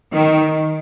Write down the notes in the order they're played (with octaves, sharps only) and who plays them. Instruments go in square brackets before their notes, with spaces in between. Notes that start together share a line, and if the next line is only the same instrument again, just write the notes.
[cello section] D#3